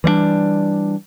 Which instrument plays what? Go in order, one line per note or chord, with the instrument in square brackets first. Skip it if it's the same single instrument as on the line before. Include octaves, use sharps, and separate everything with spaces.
[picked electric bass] E3 G3 A3 D4